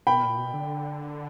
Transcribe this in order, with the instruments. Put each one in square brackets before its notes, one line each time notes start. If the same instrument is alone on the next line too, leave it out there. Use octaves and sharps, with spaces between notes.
[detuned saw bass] B2 [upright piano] G5 B5
[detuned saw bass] A#2
B2
D3